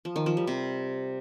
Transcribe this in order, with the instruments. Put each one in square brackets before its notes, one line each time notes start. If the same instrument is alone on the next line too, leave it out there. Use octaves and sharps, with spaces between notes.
[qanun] F3
D#3
F3
G3
C3